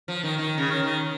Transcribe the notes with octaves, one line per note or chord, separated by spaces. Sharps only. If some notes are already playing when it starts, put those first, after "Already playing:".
F3
D#3
D#3
C#3
D#3
D#3